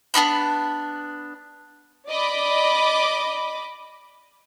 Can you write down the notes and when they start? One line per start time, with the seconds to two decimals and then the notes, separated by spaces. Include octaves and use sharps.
0.14 B3 D4 D#4 B5
2.10 D5 D#5 B5 D6